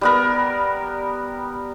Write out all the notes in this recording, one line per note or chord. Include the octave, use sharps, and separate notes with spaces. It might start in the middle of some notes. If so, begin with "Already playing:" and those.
G3 B3 A#4